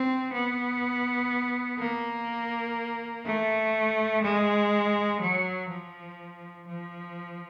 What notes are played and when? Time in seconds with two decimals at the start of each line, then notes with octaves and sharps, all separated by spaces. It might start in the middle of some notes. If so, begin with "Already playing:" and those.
Already playing: C4
0.33 B3
1.80 A#3
3.25 A3
4.23 G#3
5.21 F#3
5.70 F3
6.68 F3